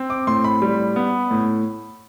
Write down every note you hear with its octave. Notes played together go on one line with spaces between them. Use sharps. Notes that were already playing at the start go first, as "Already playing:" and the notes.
Already playing: C4
D6
A2 C6
B5
G3
B3
A2